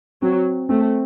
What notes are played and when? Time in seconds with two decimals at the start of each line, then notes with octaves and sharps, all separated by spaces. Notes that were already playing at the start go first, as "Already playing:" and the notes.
0.22 F#3 C4
0.69 A3 C4